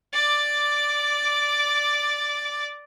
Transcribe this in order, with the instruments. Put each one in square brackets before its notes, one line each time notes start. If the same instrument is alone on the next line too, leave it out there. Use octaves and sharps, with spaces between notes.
[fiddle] D5 D6